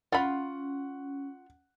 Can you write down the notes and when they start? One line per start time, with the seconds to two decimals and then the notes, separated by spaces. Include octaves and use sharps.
0.12 C#4 F4 F#5 B5